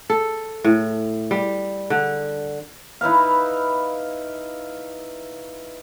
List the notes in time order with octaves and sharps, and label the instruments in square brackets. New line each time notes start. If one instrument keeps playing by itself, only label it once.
[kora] A4
A2
G3
D3
[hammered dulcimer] D#4 E4 B4 F5